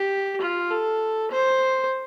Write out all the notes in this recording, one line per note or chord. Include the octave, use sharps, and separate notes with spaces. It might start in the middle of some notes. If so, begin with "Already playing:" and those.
Already playing: G4
F4
A4
C5